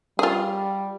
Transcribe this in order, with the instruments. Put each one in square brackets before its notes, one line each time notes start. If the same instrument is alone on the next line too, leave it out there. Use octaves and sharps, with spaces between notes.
[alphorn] G3 [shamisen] F4 G#4